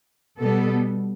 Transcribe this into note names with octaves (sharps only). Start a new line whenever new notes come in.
B2 G3 B3 A4